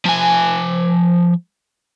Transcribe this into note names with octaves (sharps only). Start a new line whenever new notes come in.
F3 G#5